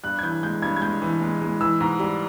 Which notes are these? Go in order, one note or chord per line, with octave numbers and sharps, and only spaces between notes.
G2 F#6
G#6
E3 G6
G#3 G6
G2 G#6
G#6
G#3 G6
E3
G#3
G#3
E3 E6
G#2
G3